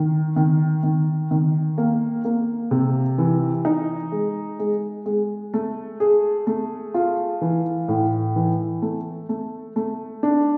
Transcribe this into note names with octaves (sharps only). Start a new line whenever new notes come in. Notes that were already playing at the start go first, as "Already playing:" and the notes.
Already playing: D#3
D#3
D#3
D#3
A#3
A#3
C3
E3
D#4
G#3
G#3
G#3
A3
G#4
A3
F4
E3
A2
E3
A3
A3
A3
D4